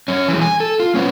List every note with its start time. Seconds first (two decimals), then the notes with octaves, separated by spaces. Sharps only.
0.08 F#2 C#4
0.28 E3 G#3
0.41 G#5
0.60 A4
0.80 F4
0.95 B3 C#4